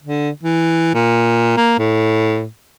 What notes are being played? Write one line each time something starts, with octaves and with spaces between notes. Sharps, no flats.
D3
E3
A#2
A#3
A2